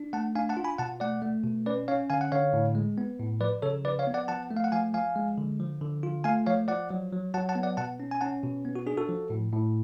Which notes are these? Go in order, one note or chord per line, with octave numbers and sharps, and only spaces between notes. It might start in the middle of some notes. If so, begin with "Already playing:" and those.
Already playing: D4
A3 F#5 A5
D4 F5 G#5
F#5 A5
F4
G#5 B5
B2 F#5 A5
A3 D5 F#5
A3
B2
C#4 B4 D5
C#4 C#5 F5
D3 F5 G#5
F#5
D3 C#5 F5
A2
G#3
B3
A2
F3 B4 D5
C#3 A4 C#5
F3 B4 D5
C#5 F5
B3
D5 F#5
F3 F#5 A5
A3
F5
F#5
F3 F5 G#5
F3 F5 G#5
G#3
D3
F3
D3
F4
A3 F5 G#5
F3 C#5 F5
F3 D5 F#5
F#3
F#3
F#3 F#5 A5
F#5 A5
B3
D5 F#5
B2 F#5 A5
C#4
G#5
C#4 F#5 A5
B2
B3
F#4
D4 G#4
F#4 A4
F3
A2
A2